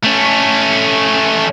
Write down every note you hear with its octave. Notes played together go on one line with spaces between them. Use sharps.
A3 C#4